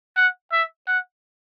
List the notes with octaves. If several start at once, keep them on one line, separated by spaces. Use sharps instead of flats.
F#5
E5
F#5